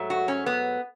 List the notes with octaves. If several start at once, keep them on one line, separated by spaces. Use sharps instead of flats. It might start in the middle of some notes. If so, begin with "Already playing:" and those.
Already playing: G#2 F#3 A3
F#4
C#4
B3